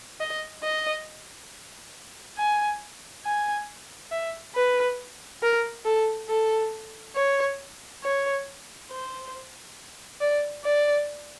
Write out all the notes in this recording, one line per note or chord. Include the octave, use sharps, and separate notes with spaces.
D#5
D#5
G#5
G#5
E5
B4
A#4
A4
A4
C#5
C#5
C5
D5
D5